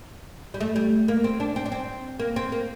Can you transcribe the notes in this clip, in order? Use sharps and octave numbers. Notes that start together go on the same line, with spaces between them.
G3
A3
G3
A#3
C4
D4
C4
D4
C4
A#3
C4
A#3